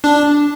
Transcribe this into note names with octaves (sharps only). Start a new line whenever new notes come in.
D4